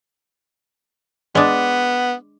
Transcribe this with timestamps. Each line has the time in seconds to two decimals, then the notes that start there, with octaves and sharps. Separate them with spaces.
1.35 G#3 B3 D4